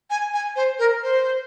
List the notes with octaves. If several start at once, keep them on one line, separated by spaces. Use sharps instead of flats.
G#5
G#5
C5
A#4
C5